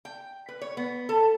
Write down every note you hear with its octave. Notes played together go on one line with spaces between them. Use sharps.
G5
B4
C#5
B3
A4